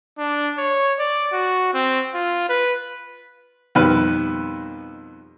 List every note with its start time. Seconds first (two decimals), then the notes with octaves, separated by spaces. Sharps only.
0.18 D4
0.58 C#5
0.99 D5
1.33 F#4
1.74 C4
2.14 F4
2.49 B4
3.75 F2 B2 D#3 G3 B4 F6